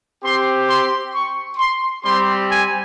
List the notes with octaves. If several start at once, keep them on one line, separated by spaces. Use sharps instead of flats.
C4 G4 C6
C6
C#6
C6
G3 C4 G4 C6
G#5